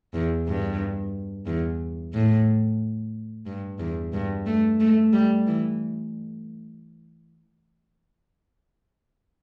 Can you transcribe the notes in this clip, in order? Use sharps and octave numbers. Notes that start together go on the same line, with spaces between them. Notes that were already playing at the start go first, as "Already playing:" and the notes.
E2
G2
E2
A2
G2
E2
G2
A3
A3
G3
E3